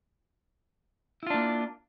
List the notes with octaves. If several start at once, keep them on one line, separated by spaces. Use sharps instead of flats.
A#3 D4 E4 F4